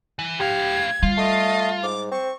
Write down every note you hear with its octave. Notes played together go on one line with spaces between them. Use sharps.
E3
A2 G4 F5 G#6
G3 F4
A3 D#5
G#2 D6
C4 C#6